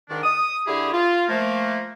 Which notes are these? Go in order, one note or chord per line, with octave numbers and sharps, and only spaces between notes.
G#2 D#3 D4
D#6
D3 E4 G4 G#4
F4
F3 A3 A#3